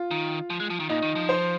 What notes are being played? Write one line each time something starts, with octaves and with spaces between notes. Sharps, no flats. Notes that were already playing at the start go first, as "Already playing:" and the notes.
Already playing: F4
D#3
F3
G#3
F3
D#3
A#2 D#4
D#3
F3
C5